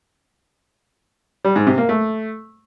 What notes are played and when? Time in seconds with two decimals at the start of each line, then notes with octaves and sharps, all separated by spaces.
1.44 G3
1.56 G#2
1.67 C3
1.78 A#3
1.89 A3